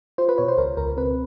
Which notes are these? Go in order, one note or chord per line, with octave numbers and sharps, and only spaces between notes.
F4 C5
B4
B2 C#5
C5
C#2 A#4
C#2 A#4
C4 B4